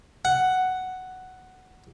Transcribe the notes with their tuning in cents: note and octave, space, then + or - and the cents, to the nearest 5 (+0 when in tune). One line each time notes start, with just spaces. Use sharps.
F#5 +5